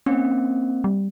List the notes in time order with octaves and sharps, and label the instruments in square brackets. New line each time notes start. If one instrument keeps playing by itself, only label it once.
[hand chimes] A#3 C4 [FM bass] C#4
[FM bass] G3